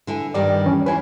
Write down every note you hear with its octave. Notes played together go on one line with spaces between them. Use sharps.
D3 E4 G#5
G2 D#3 G3 D5
E3 C#4
E3 E4 F4 B4 C#5 G#5